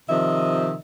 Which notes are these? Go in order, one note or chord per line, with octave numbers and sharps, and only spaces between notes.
C3 D#3 F3 D#5 E5